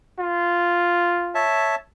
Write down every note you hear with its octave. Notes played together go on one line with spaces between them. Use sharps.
F4
C#5 E5 A5